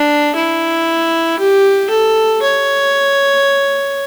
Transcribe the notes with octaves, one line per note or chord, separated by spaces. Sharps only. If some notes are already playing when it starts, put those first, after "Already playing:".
Already playing: D4
E4
G4
A4
C#5